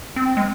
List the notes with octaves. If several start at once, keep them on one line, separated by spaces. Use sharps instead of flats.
C4
G#3